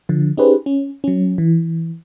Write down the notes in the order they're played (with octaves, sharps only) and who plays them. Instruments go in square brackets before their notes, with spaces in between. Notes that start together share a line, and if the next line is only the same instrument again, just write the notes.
[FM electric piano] D3 F3
C#4 D#4 G4 G#4 B4 C5
C#4
F#3 C#4
E3